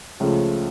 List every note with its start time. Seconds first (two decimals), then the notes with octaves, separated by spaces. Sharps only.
0.20 C#2 C#3 F3 A3